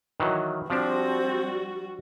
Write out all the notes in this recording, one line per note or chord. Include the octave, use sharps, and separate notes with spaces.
D#3 E3 F#3
F3 G3 C4 D4 F#4